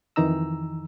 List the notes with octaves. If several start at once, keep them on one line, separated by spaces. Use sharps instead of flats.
F2 D#3 E3 D#4 A#5 E6